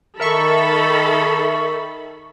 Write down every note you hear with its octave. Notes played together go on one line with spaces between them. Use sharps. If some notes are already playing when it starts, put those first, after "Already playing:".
D#3 A4 A#4 E5 B5 C#6